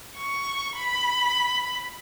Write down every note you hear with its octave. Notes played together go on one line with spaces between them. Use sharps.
C#6
B5